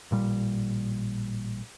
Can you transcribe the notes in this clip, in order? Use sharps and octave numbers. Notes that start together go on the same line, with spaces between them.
A1 A#2 G3